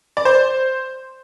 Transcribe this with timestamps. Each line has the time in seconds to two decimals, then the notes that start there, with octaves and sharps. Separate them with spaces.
0.17 D5
0.25 C5